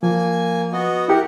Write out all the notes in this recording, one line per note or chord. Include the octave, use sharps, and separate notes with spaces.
F3 A#3 G#5
B3 F#4 D#5
E4 G4 A#4 F#5